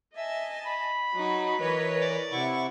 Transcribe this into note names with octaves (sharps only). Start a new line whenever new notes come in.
D#5 E5 G#5 A5
B5
F#3 D#4 F#4
E3 A#4 B4 C#5 D#5
D5
C3 E4 F#5 C#6